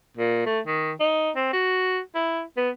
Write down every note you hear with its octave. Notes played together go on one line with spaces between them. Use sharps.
A#2
A3
D#3
D#4
C4
F#4
E4
B3